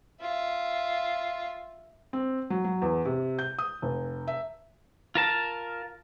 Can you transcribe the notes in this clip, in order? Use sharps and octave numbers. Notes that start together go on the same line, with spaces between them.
F4 E5
C4
F#3
F#3
E2
C3
G6
D#6
F1
E5
F4 A#4 A5